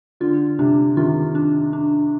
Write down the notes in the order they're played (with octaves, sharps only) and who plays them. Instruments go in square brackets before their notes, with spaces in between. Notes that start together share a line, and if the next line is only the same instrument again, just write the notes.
[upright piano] D3 [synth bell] F4
[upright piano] C3 [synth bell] D4
[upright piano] C3 D#3 [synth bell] F4
[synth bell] D4
D4